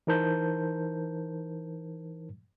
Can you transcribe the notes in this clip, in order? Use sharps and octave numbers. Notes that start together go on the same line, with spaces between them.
E3 D#4 A#4 C5 A5 G6